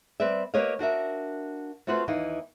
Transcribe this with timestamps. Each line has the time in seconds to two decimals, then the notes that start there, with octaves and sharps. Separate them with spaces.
0.20 G3 C4 B4 D5 E5
0.54 A#3 G4 B4 C#5 D#5 F5
0.79 D4 F#4 A#4 E5
1.87 A3 C4 F4 F#4 B4 C5
2.08 D#2 E3 D#4 F5